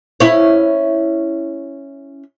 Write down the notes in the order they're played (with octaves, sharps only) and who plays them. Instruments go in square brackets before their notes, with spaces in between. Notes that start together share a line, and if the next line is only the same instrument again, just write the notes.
[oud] C#4 E4 C#5